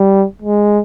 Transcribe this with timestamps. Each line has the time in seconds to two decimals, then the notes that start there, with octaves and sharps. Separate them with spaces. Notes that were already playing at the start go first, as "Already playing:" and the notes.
Already playing: G3
0.42 G#3